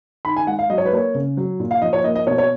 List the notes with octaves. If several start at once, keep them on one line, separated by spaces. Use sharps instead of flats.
D#3 B5
G#5
G#3 F#5
F5
F#3 D#5
C#5
B4
A#3 C#5
C#3
F#3
A#2
F5
F3 D#5
C#5
A#3 D#5
D#5
B2 C#5
C#5